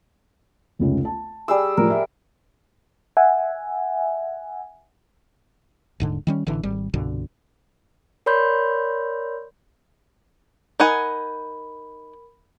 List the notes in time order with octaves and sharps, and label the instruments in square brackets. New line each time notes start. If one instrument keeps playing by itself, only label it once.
[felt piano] F1 C#2 C#4
A5
[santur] G3 G#4 E6
[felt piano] A2 F3 [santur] A#4
[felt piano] E5
[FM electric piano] E5 F#5 G#5
[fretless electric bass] D#1 G#2 D3
D#3 G3 C#4
A1 D3 E3
G#1 G3
C2 G2 B2 D3
[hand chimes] A#4 C#5 D5 B5 C6 G6
[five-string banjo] D#4 F#5 G#5 [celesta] A#4 B5